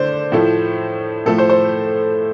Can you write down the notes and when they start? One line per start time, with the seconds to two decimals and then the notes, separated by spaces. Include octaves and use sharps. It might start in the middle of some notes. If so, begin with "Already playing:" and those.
Already playing: D3 A3 C5 D5
0.32 A2 F3 A3
1.26 A2 F3 A3 A4
1.38 C5
1.49 C5